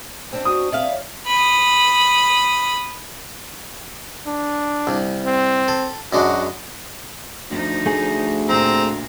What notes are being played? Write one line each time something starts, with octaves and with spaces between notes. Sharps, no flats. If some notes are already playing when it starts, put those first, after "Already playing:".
B2 C4 D4
F#4 D#6
C4 D5 E5 F5
C#5
B5 D#6
D4
C2
C4
A4
F#2 G#3 D4 F#4
D2 F3 D#4
A3 G#4
A#2 C4 A#5